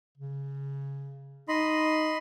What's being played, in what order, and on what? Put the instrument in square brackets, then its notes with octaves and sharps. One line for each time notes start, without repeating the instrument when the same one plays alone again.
[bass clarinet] C#3
[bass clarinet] D#4 [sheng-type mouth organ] D#5 B5 C6